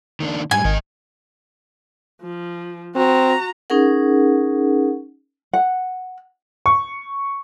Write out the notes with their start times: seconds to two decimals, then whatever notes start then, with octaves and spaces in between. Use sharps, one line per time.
0.20 D#3 A#3 D4
0.51 G#2 G3 G#5
0.64 G#1 D#3 A#4 D#5
2.22 F3
2.95 C4 F#4 A#5
3.70 C#4 D#4 G#4 A#4 F#5
5.53 F#5
6.66 C#6